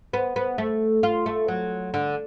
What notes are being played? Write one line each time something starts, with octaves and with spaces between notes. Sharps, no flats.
B3
B3
A3
F4
A3
F#3
D3